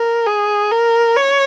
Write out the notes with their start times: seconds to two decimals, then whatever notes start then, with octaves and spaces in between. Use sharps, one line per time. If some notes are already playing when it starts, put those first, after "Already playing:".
Already playing: A#4
0.26 G#4
0.71 A#4
1.16 C#5